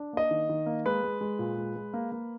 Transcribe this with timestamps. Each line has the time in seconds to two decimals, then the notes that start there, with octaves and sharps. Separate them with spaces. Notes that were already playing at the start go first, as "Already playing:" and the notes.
Already playing: D4
0.13 A#3 D#5
0.31 D#3
0.49 D#3
0.66 A#3
0.85 G#3 B4
1.03 G#3
1.21 G#3
1.39 A#2
1.58 G#3
1.76 G#3
1.94 A#3
2.12 A#3